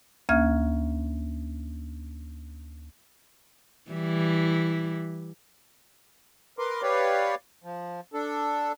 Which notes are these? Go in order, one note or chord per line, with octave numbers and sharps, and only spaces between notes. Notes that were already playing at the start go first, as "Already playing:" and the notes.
D2 A#3 C#4 E5 F6 G#6
E3 G3 E4
A#4 B4 C6 D6
G4 B4 C#5 D5 F5
F3
D4 A4